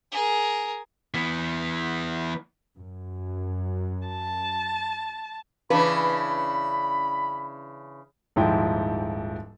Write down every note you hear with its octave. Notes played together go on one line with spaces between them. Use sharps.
G#4 A#4
E3 B3
F#2
A5
C#3 E3 D4 B4 B5
D#1 G#2 F3 E4 G5